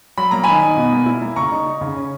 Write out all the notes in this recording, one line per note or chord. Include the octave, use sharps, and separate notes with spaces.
F#3 B5
A#3 A#5
D#3 G#5 B5
D#4
B2
A#3
E4
A#3
C#3 A#5 C#6
D#4
D#4
C#3
C#4